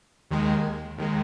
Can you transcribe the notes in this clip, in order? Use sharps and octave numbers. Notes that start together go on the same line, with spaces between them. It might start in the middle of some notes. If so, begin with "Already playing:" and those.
D#2 D#3 G#3
D#2 D#3 G#3